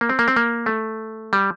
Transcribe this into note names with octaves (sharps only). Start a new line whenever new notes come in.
A#3
C4
A#3
C4
A#3
A3
G3